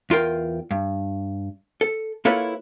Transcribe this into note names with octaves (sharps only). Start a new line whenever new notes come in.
E2 F4 A#4 G5
G2
A4
A#3 E4 F4 A4 B4 C#5